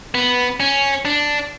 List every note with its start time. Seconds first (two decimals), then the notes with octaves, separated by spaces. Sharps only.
0.15 B3
0.60 C#4
1.05 D4